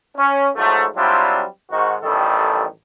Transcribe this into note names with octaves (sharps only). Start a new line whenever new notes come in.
C#4
G#2 F3 F#3 A3
F#3 G3 C4 D4 E4 F4
G#2 D#3 F#4
A1 D#3 G3 A4